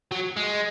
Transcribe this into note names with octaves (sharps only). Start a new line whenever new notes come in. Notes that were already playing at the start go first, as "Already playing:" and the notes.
F#3
G#3